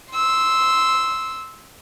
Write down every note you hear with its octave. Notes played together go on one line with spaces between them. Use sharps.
C6 E6